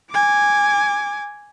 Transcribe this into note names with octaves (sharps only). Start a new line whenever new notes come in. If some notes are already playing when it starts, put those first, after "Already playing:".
G#5 D6